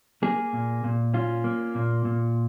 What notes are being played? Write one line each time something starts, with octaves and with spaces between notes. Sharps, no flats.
A#3 G#4
A#2
A#2
C#4 F4
A#3
A#2
A#2